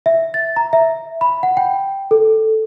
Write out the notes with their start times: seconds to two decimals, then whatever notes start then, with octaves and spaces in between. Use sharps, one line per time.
0.06 E5
0.34 A6
0.56 A#5
0.73 E5
1.21 B5
1.43 F#5
1.57 G5
2.11 A4